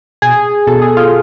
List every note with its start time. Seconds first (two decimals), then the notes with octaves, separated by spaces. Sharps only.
0.22 B2 G#4
0.67 B2 A4
0.82 G#4
0.97 F4